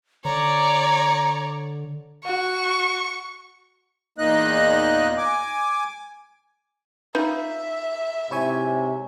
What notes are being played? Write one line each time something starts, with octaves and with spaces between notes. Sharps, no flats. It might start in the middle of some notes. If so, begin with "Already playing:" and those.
D3 C#5 D5 A#5
F#4 C#6
E2 A#2 A#3 D#4 D#5 F#6
G#5 D6
D#4 F4 B4 E5
G#2 C3 E4 C#5 G#5